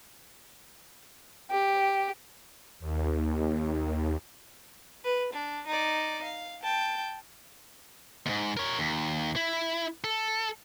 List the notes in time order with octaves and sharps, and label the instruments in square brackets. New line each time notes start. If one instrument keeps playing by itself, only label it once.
[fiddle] G4
[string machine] D#2
D#2
[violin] B4
D4
D#4 D5
F5
G5 A5
[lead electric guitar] D#2 G#2
A#4 C#5
D#2
E4
A4